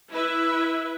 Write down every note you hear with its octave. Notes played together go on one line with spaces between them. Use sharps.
E4 B4 E5